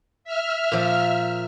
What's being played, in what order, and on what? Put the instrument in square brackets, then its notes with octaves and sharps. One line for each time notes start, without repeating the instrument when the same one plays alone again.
[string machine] E5 F6
[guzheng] A#2 F3